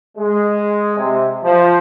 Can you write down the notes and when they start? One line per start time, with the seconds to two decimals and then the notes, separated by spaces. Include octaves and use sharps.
0.18 G#3
0.97 C3
1.43 F3